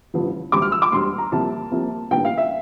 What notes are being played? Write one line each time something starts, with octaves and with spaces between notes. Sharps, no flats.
A1 G2 D3 F3
E1 D2 D3 G3 D6
F6
E6
D6
E1 D2 D3 G3 C6
A#5
C2 C3 F3 A#3 A5
C2 C3 F3 A#3
A1 G2 D3 G3 A#3 G5
F5
E5